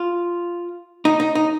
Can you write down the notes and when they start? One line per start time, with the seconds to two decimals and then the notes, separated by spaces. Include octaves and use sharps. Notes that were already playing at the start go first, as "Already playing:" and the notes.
Already playing: F4
1.05 D#4
1.20 D#4
1.35 D#4